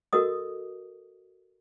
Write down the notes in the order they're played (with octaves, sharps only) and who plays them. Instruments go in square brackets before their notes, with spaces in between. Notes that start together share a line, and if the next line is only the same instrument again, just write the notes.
[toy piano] F#4 A4 A#4 D#5 D#6